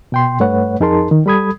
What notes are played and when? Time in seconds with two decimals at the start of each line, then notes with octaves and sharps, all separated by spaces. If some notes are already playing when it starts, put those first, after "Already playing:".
0.12 B2 G5 C6
0.40 G2 A3 B4 C#5 F#5
0.80 F2 D#4 G#4 A#4 A5 C6
1.11 D#3
1.26 G3 A4 B5 D#6 G#6